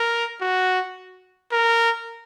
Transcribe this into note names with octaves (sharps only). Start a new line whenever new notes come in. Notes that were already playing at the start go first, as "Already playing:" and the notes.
Already playing: A#4
F#4
A#4